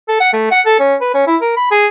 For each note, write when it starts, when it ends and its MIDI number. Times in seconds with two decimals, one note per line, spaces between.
0.08 0.17 69
0.20 0.28 78
0.33 0.49 57
0.51 0.61 78
0.66 0.76 69
0.80 0.95 61
1.01 1.13 71
1.14 1.22 61
1.27 1.36 64
1.41 1.54 70
1.57 1.69 83
1.71 1.87 68